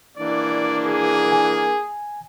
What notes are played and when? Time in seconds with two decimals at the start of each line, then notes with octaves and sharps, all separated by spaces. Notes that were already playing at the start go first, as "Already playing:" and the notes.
0.17 E3 A#3 D4 D5
0.86 G#4
1.32 G#5